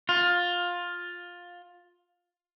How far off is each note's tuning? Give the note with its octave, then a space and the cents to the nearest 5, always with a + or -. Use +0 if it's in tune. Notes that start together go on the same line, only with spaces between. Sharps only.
F4 +15